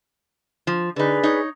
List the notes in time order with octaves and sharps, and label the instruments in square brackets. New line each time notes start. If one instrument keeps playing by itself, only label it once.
[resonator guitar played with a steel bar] F3
[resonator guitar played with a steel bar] D3 D#4 [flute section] G#4 B4 D5
[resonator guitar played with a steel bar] D#4 C#5